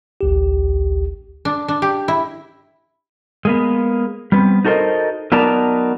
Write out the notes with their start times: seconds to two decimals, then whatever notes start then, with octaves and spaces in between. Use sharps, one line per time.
0.21 A1 D2 G4
1.45 D4
1.68 D4
1.82 G4
2.08 E4
3.45 G#3 A#3 B3
4.32 G3 B3 C4
4.65 D#4 F#4 A4 A#4 C5 D#5
5.32 F#3 B3 D#4 A#4 D5 A5